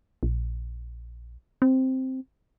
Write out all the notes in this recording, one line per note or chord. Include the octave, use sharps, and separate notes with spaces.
A#1
C4